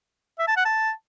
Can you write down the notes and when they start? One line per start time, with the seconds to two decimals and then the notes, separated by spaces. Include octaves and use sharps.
0.39 E5
0.48 A5
0.57 F#5
0.65 A5